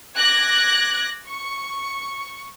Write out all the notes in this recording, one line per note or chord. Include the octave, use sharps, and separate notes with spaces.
D6 F#6 G#6 A#6
C#6